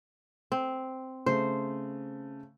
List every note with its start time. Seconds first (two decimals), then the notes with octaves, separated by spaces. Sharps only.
0.52 C4
1.26 C#3 A3 C5